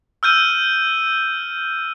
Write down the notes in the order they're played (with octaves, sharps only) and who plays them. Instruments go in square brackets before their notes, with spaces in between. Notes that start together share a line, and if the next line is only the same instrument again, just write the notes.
[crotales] E6 F6 G6 D#7